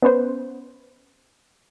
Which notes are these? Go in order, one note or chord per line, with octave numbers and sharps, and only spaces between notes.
B3 C#4 B4 C5